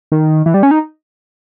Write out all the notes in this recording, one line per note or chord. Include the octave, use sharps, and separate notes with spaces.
D#3
E3
G3
C#4
D#4